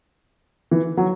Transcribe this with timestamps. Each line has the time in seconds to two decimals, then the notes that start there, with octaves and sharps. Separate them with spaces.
0.71 E3
0.97 F#3